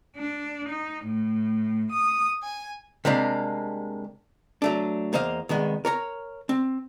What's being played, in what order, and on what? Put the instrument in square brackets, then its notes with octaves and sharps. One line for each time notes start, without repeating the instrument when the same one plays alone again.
[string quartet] D4
D#4
A2
D#6
G#5
[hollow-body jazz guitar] C3 G3 G#3 A#3 D4
F#3 A3 D4
E2 A#3 C5 D#5 F5
C2 D#3 G#3 B3
A#4 C#5 A#5
C4